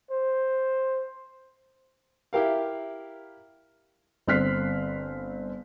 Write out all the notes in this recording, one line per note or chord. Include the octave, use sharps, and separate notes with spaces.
C5
E4 G4 A#4 F5
G1 C4 F6 F#6 B6 C7